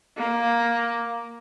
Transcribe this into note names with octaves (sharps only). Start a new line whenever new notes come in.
A#3